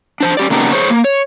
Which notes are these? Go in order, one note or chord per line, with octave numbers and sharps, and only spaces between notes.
D4 C5 A5
C#4 G4 D5
C#3 A#3 B3 D4 D#4 G4
G#4 C5 C#5
A#3
C#5